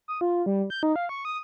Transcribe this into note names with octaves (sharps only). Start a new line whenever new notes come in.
D#6
F4
G3
G6
D#4
F5
C#6
D#6